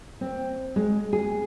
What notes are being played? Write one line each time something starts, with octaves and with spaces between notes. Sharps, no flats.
C4
G#3
G#4